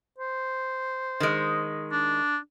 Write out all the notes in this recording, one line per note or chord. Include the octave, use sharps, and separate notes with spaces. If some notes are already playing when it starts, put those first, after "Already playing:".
C5
D#3 G#3
D4